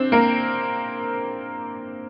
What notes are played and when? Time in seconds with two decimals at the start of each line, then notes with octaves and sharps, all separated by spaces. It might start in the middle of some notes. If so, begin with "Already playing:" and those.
Already playing: C4 D4 C5
0.12 A#3 A#4